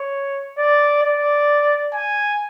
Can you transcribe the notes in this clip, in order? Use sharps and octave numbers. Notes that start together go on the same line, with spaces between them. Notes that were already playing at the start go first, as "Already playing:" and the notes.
Already playing: C#5
D5
D5
G#5